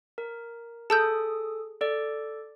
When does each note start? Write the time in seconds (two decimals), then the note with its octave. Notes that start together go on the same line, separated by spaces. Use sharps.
0.18 A#4
0.90 G#4 A4 A5 D#6 E6 G6
1.81 A4 D5